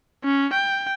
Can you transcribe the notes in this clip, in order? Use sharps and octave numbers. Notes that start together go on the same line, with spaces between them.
C#4
G5